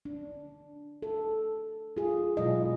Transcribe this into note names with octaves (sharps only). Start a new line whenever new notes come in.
D4
A4
F4 G#4
B2 F#3 G#3 E4 F4 D#5